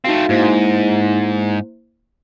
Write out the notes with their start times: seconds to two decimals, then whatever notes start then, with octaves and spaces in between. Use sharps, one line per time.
0.05 A3 C4 D#4 F#4 F5
0.29 G#2 A#3 E4 C5